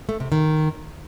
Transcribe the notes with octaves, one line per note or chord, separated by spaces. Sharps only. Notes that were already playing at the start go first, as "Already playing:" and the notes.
A3
C3
D#3